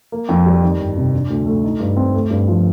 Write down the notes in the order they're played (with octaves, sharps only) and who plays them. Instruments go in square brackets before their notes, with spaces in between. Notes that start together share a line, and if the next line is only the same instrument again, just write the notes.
[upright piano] A#3
F2
G3
D#3
G1
C3
D4
D2
A3
D#4
G2
C4
A3
G2
F3